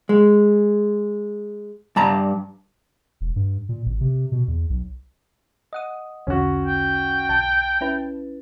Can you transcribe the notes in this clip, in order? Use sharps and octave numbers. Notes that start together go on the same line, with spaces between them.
G#3
G2 A5 A#5
E1
G2
A#2
G#1
C3
B2
E2
B1
D#5 F#5 D#6
B1 E2 D3 C#4 F#4
G5
B1 A5
C#4 E4 B4